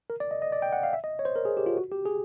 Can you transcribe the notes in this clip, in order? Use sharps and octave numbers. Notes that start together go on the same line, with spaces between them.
A#4
D5
D#5
D#5
D5
G5
F#5
F5
E5
D#5
C#5
C5
A#4
G#4
G4
F4
F#4
G4
G#4